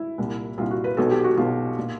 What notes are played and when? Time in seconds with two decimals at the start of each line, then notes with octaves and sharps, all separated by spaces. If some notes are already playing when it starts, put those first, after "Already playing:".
Already playing: E4
0.18 C2 A#2
0.58 C2 A#2 F4
0.71 F#4
0.84 B4
0.97 B1 B2 A4
1.11 G4
1.24 F#4
1.37 B1 B2 F4
1.79 A#2